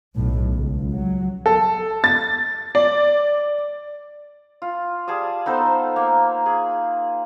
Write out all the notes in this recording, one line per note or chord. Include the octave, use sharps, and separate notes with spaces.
B1 A2
C#2
F#3
A4
A6
D5
F4
G3 G#4 A5 D#6
B3 D#4 A4 C5
A#3
G#4